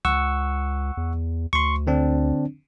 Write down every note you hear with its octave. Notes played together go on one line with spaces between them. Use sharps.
C#2 F#5 C#6 E6
E2
D2 C6 C#6
D3 C4 D4